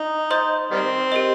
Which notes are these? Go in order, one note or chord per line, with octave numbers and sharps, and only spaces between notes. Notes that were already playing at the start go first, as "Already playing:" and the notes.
Already playing: D#4
C5 D#5 C6 D#6 G6
D#3 G3 C4
G4 A#4 D#5